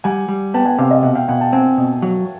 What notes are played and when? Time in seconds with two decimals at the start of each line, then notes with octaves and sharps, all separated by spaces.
0.04 G3 F#5 G#5
0.28 G3
0.54 B3 G5 A5
0.66 F#5 G#5
0.79 C3 F5 G5
0.91 D#5 F5
1.03 B2 E5 F#5
1.15 F5 G5
1.28 B2 F#5 G#5
1.40 G5 A5
1.53 C4 F#5 G#5
1.78 B2
2.02 F#3